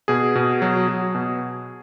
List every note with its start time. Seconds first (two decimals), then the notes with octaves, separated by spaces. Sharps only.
0.08 B2 G#4
0.35 B2
0.62 F#3
0.88 F#3
1.15 B2